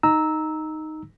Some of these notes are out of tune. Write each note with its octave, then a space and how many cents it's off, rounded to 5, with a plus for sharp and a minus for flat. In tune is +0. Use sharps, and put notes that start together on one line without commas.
D#4 +0 A#5 +0 E6 -15